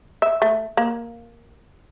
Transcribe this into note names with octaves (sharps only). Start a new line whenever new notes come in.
E5
A3
A#3